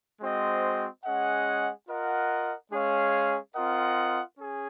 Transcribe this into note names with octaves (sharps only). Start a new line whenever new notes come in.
G#3 C4 F#4 C5 D#5
G#3 C#4 G#4 D#5 F#5
F4 A#4 D#5 F#5
G#3 C#4 G#4 C#5 F5
C4 F4 A#4 D#5 F#5
C#4 G#4